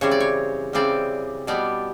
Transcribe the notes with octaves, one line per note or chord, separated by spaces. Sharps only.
C#3 E3 G3 C4 C#5
D5
C#5
C#3 E3 G3 C4 D5
B2 G3 B3 D5